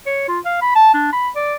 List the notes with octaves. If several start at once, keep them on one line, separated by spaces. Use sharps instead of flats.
C#5
F4
F5
B5
A5
D4
B5
D5